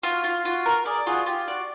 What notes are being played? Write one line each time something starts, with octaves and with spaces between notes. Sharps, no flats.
F4 F#4
F4
F4 F#4
A#4
G#4 A#4 D5
F4 F#4 G#4
F4 G4
F#4 D5